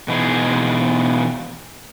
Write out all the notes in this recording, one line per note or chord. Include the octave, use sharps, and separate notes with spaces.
B2 E3 D#4 G#4